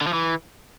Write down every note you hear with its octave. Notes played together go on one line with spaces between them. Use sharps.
D3
F3
E3